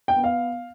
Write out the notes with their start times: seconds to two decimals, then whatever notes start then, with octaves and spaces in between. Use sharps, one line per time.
0.08 G5
0.16 B3
0.24 F5